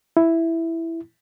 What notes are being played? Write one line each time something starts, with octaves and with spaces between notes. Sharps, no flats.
E4